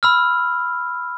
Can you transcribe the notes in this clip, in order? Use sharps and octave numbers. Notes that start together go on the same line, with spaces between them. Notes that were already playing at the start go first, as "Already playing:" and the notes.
B5 E6 F6